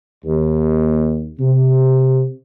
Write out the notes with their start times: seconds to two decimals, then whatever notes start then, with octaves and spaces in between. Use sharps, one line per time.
0.24 D#2
1.39 C3